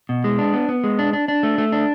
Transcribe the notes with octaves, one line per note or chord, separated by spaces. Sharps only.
B2
G#3
D4
B3
B3
G#3
D4
D4
D4
A3
A3
D4